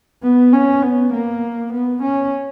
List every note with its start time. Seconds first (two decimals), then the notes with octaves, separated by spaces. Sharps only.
0.23 B3
0.53 C#4
0.83 B3
1.13 A#3
1.73 B3
2.02 C#4